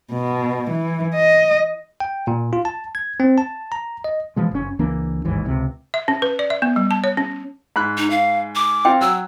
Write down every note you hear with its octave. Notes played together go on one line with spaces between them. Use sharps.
B2
E3
D#5
G5
A#2
F4
A5
G#6
C4
A5
A#5
D#5
B2 E3 F3 G#3
F#1 C#4
C#2 E3 A#3 D4
A1 D#2 G#2 E3
C#2 C3
E5
C#4
B4
D5
E5
B3
G3
A5
C#5
C#4
G#2 B5 F#6
D#4
F5
D6
C4 F4 F5 G5
F#3 E6